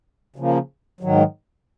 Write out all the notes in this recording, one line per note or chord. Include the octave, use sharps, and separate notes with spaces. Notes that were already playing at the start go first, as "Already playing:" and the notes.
C#3 F3 A#3
G#2 D#3 F#3